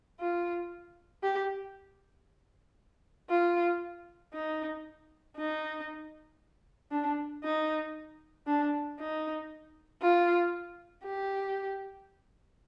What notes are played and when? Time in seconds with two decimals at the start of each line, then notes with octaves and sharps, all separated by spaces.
0.20 F4
1.23 G4
3.30 F4
4.33 D#4
5.36 D#4
6.91 D4
7.43 D#4
8.47 D4
8.99 D#4
10.02 F4
11.05 G4